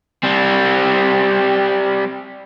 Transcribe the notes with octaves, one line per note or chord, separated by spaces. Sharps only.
G3 C4